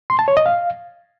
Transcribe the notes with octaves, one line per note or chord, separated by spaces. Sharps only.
C6
A5
C#5
D#5
F5